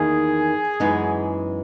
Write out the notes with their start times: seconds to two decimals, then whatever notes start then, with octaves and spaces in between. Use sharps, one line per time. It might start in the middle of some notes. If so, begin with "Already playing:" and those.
Already playing: E2 D#3 A#3 G#4
0.80 F#2 E3 G#3 B3 D#4